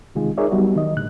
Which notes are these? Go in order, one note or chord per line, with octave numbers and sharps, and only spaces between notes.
C3 D#3 G#3 D#4 F4 G#4
D#4 G#4 A#4 C#5 D5 E5
F#3 G3 B3 D#4 F#4
D#3 D#5
A2 D3 F#6